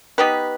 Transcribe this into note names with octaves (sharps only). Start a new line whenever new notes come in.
B3 D#4 G4 B4